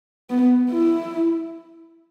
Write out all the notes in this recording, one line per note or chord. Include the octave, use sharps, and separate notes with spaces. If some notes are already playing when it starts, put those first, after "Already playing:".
B3
E4